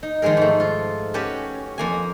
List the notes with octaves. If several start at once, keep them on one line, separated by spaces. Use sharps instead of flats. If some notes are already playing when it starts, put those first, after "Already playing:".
D#4
D#3 F3 G#3 G#4 A#4
G#2 A3
F4
C#4 F#4 G4 B4 A5
F2 A#3 G#5